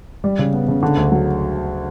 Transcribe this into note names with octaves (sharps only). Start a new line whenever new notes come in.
G3
C#3
B3
C#3
D3
D2
F#3